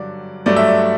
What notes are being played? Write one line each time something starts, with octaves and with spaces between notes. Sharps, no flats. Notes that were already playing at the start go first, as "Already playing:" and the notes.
Already playing: G2 D3 F#3 D5
G2 F#3 A3 D5
E5
D5